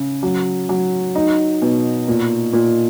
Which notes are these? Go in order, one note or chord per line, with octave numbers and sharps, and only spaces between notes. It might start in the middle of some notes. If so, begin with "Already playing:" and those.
Already playing: C#3
F#3
F#3
D#4
B2
A#2
A#2